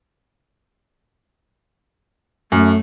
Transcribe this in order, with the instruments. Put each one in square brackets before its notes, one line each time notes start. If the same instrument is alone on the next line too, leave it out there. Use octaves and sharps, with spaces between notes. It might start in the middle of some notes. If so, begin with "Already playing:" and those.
[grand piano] F#2 [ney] A3